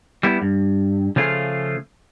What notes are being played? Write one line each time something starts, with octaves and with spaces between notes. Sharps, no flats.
G3 B3 E4
G2
C#3 F3 A3 F4 G#4